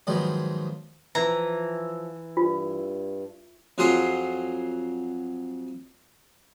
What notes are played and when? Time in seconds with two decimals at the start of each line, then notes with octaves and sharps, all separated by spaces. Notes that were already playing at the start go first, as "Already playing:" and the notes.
0.07 G#2 D#3 F3 F#3 B3 F4
1.15 E3 F3 A#5
2.37 G2 F4
3.78 F2 F#3 F4 G#4 F#5 C6